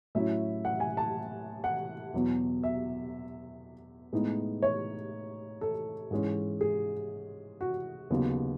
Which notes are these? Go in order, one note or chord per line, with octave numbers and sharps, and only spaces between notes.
A2 F#3 C#4 E4 E5
F#5
G#5
A5
F#5
E2 B2 F#3
E5
A2 G#3 B3 D#4
C#5
A4
G#2 E3 G#3 C#4
G#4
F#4
D#2 C#3 F#3 B3 D#4